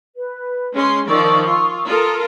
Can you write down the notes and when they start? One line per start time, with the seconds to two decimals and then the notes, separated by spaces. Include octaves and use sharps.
0.16 B4
0.74 G#3 C#4 C6
1.08 D#3 F3 D5 C#6 D#6 E6
1.45 F4
1.87 F4 A4 A#4 D#6